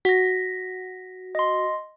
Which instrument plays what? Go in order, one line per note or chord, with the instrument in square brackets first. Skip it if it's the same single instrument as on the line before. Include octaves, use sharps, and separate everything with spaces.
[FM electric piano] F#4 [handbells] A#6 B6
[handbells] D#5 C6